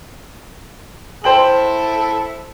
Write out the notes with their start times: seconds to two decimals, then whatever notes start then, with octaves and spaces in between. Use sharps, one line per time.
1.24 E4 A4 C5 G5 F#7